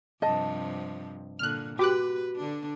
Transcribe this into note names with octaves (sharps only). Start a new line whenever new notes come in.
G2 C3 F3 D#5 A5
A#2 D3 F6 F#6
F#4 G4 B4 D6 F#6
D3 D4